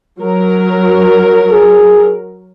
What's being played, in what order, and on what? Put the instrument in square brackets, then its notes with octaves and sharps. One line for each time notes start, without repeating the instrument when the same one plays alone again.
[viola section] F#3 A#4
[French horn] G#4